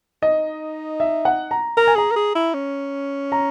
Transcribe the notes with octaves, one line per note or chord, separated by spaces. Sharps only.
D#4 D#5
E5
F#5
A#5
A#4 A#5
G#5
G#4 A#5
A#4
G#4
E4
C#4
A#5